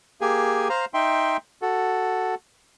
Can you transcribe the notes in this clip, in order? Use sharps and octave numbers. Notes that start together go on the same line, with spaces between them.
A#3 G4 G#4 G#5
C5 F5 A#5
D#4 E5 G5 C6
F#4 A4